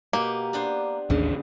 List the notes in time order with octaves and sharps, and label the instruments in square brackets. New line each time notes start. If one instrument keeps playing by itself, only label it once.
[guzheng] B2 B3 G4 [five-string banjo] A#3
[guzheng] B3 D4 C5
[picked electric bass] A1 D#2 D4 [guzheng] C#3